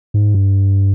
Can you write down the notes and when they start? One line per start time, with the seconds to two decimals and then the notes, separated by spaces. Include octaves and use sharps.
0.14 G#2
0.34 G2